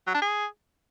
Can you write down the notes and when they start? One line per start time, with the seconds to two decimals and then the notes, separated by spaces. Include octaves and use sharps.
0.07 F#3
0.14 D4
0.22 G#4